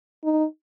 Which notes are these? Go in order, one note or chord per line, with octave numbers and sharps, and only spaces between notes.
D#4